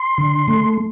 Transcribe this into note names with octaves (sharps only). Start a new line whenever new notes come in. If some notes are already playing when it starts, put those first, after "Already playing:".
Already playing: C6
D3
A3